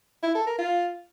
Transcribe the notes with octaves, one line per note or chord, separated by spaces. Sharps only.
E4
A4
A#4
F4